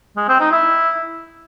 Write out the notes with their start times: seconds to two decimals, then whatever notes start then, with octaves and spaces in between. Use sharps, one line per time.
0.17 G#3
0.28 C4
0.40 D#4
0.52 E4